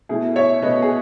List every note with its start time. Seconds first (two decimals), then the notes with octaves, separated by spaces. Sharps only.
0.09 B2 A3 E4 G#4
0.35 C#5 E5
0.62 B2 A3 B4 D#5
0.82 G#4